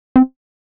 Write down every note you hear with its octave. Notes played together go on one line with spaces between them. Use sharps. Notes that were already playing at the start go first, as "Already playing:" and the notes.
C4